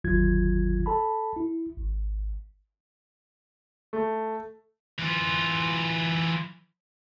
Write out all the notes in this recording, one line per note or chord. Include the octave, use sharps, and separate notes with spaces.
G1 D#2 D#3 F#3 F4 G#6
A4 A5 B5
E4
G#1
A3
E3 F4